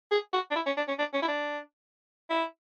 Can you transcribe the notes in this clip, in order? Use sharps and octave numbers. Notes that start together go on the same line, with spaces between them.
G#4
F#4
D4
E4
C#4
D4
C#4
D4
C#4
E4
D4
E4